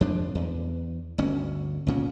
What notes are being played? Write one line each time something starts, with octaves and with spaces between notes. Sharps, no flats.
F2 F3 D4
E2
G1 D2 C#4
C#2 A#2 C#4